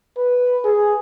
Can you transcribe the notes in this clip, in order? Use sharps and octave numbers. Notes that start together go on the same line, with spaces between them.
B4
G#4